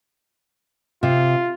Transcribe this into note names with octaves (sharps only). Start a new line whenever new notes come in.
C3 F4